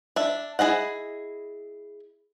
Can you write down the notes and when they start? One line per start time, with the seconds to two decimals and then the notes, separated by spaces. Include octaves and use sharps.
0.16 D4 E5
0.59 E4 F4 G#4 D#5 F#5